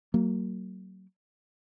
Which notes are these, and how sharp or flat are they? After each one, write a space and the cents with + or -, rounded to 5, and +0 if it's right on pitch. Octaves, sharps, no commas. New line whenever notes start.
F#3 +30 A#3 -20